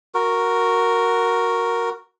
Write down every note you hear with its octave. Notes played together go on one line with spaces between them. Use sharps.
F#4 A#4